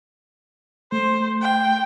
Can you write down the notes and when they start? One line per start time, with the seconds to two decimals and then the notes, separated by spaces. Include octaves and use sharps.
0.92 A3 C5
1.41 G5